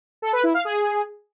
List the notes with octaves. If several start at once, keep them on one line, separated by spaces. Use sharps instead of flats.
A4
B4
E4
F5
G#4